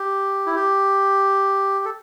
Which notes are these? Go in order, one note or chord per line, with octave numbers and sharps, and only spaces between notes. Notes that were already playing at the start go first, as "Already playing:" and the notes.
Already playing: G4
E4
G4
A4